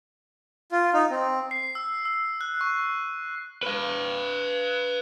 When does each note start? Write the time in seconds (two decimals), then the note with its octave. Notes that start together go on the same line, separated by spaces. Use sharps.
0.72 F4
0.94 D#4
1.10 C4
1.51 C7
1.75 E6
2.05 E6
2.41 F#6
2.61 C#6
3.63 B4 F5